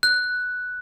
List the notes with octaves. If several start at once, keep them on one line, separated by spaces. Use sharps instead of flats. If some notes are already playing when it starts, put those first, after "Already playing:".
F#6